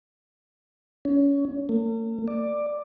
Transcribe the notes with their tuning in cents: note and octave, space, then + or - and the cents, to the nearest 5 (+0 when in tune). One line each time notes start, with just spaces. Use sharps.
C#4 +25
A#3 -45
D5 +10